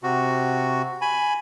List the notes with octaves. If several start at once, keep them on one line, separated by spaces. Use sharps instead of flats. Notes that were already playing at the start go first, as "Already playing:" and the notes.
C3 F#4
G#5 B5